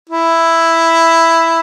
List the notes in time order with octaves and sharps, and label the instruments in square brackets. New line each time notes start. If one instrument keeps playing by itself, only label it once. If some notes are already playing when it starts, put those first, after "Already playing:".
[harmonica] E4